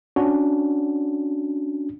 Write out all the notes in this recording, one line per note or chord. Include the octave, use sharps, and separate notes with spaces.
C#4 D4 F#4